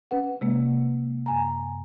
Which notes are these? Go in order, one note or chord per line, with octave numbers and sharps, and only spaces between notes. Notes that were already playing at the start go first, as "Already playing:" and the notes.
C#4 B4 F#5
C3 G#3 A#3
F#2 G#5 A#5